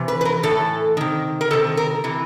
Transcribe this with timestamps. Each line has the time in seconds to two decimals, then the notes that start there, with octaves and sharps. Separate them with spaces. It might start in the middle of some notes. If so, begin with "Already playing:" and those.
Already playing: C3 E3
0.08 B4
0.21 B4
0.25 A#4
0.43 A2 E3 A4
0.97 C3 D#3
1.41 A#4
1.51 C3 D#3 A4
1.77 A#4
2.04 C3 E3